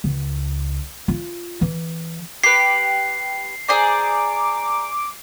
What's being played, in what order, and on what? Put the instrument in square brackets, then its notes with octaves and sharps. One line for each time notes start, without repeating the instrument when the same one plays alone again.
[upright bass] C#2
F4
E3
[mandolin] G4 B4 [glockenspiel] C7
[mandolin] G#4 C5 D5 [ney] A#5 [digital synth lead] D6